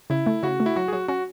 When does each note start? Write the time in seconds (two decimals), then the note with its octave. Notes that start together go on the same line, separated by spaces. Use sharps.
0.10 C#3 E4
0.26 A3
0.43 C#3 F#4
0.60 A3
0.66 E4
0.76 F#3 F#4
0.88 G#4
0.92 F#3 F#4
1.08 C#4 F#4